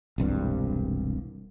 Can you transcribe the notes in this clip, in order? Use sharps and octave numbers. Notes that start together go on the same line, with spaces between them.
E1 C2 G2